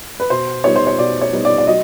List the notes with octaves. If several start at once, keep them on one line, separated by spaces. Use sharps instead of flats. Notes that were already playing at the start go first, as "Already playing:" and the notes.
B4
B2 C5
G3 B3 D#4 C#5
C5
C#5
B2 D5
C#5
G3 B3 D#4
D5
D5
F#3 D#5